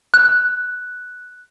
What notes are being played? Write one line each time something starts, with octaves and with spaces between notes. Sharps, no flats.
F#6